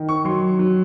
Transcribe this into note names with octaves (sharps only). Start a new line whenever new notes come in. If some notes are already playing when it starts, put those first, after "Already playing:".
Already playing: D#3
C#6
F#3 C6
F#3